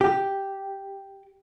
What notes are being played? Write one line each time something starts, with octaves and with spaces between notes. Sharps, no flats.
G4